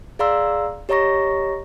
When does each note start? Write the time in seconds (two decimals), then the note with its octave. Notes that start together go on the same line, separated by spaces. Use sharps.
0.19 G#4 D5 F5 A#5 C6 E6
0.89 G4 C#5 D#5 A#5 C#6 A#6